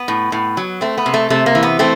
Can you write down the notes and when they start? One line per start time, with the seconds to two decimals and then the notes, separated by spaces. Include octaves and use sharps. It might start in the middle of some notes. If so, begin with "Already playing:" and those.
Already playing: B3
0.08 A2
0.32 A2
0.57 F#3
0.81 A3 C4
0.98 B3
1.06 C3
1.14 A3
1.30 C3 A3
1.46 A#3
1.55 E3
1.63 B3
1.79 A3 C4